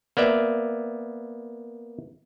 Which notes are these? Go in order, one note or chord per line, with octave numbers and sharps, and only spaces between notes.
A#3 B3 D5 E5